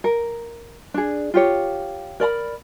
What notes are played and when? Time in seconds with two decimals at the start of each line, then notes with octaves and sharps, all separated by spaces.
0.04 A#4
0.94 D4 G#4
1.34 F4 G4 C#5
2.20 A#4 D5 A#5 B5